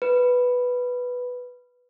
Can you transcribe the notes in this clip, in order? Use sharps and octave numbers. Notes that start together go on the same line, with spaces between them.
B4